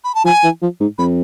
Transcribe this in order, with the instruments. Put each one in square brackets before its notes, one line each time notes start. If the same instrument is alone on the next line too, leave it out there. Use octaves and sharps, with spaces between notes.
[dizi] B5
A5
[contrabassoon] F3 [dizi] G#5
[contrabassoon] E3
F3
G#2
[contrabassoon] F2 [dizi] B5